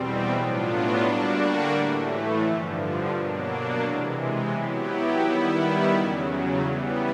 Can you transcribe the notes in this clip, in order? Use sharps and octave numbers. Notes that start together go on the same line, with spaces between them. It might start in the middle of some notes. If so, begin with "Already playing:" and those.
Already playing: E2 B2 G3 C4
A2 F#3 B3 D4 F4
D3 G3 A#3 D4 F#4
A2 E3 A3
G2 D3 F3
B2 F#3 A#3 D4
C3 E3 G#3
F#3 B3 E4 G4
D#3 G3 B3 E4
E2 C#3 F#3
E3 G3 B3